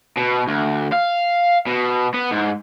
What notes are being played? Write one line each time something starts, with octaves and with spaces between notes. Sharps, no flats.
B2
D2
F5
B2
B3
G#2